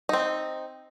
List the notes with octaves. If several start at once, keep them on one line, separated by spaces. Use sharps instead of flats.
C4 D#4